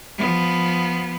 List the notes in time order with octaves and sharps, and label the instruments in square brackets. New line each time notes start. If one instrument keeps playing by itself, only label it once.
[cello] F3 B3